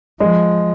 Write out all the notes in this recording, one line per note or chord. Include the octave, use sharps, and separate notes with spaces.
F3 G#3